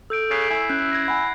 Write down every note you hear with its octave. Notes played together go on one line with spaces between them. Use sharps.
A4 E6 G6 D7
C#3 A6 B6 C7
E4 G#5
C#4 F#6 G6
G#6 A#6
F#5 G#5 B5